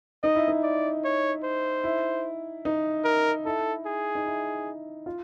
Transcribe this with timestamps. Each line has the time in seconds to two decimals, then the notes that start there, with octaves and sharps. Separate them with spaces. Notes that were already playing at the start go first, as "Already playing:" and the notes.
0.23 D#4 D#5
0.35 E4
0.48 D#4
0.63 D5
1.04 C#5
1.44 C5
1.84 E4
2.65 D#4
3.04 A#4
3.45 E4 A4
3.86 G#4
4.15 D#4
4.26 E4
5.06 F4